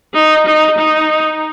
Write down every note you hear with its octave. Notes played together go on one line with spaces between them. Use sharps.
D#4
D#4
D#4